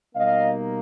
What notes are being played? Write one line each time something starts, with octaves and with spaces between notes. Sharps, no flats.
B2 G3 A#3 D#4 D#5 F5